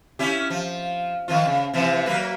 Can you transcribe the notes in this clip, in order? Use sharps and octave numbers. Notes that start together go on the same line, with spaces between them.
C#4 E4 G4
F3
D#3 F3 F4
C#3
C3 E3 F3
F#3 A#3 B4